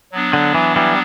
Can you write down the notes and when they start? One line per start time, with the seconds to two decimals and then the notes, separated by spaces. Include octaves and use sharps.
0.12 F#3 B3 D4
0.33 D3
0.55 E3
0.76 E3 G3